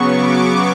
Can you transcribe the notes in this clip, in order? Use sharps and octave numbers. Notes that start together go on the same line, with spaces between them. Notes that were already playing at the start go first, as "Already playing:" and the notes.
Already playing: C#3 F#3 B3 C#6
D6